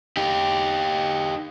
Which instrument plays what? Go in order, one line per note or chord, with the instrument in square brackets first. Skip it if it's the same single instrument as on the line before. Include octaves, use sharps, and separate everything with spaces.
[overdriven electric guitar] D#4 G4